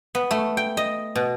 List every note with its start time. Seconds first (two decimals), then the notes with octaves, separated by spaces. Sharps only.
0.15 B3
0.31 A3
0.57 G5
0.77 D#5
1.15 B2